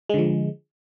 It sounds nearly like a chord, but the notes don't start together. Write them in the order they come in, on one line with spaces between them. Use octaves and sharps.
G#3 D3 F3